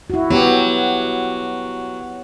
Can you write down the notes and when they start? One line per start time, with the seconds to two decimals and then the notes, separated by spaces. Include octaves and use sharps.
0.10 E4 F#4
0.30 F#3 B3 G4